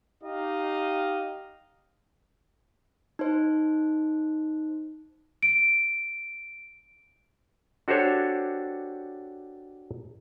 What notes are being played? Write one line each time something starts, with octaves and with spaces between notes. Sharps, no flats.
D#4 G4 D#5 F5
D#4 C5
D7
D4 F#4 G4 A4 C5 C#5